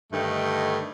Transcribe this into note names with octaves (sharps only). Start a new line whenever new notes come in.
G2 D3 D#3 A3 D#5 G5